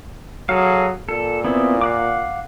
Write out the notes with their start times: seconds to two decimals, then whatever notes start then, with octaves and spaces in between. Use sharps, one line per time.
0.49 F#3 G#4 A4 F5
1.09 A#2 A4
1.44 B3 C4 E4
1.81 F5 F#5 D6